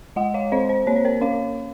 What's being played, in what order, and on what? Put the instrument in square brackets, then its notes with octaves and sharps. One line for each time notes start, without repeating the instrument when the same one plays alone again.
[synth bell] G#3 D#5 F#5
C#5 F5
C4 C5 D#5
C5
A#3 C#5
C5
A#4 C#5
C#4 C#5 F5